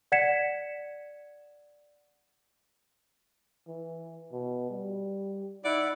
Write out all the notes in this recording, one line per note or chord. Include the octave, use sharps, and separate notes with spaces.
D5 F#5 G#6 B6 C#7 E7
E3
B2
G3
D#4 E4 D5 F#5